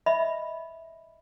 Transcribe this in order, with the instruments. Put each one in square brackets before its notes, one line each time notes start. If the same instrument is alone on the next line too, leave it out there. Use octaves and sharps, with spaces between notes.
[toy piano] D#5 E5 B5